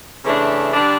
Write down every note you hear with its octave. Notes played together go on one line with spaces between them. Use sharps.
C#3 E3 A3 D4
D3 G3 D4